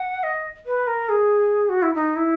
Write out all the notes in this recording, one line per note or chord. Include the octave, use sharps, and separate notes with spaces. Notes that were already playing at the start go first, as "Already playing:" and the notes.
Already playing: F#5
D#5
B4
A#4
G#4
F#4
E4
D#4
E4